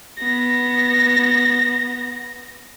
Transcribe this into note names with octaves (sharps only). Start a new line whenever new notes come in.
B3 A#6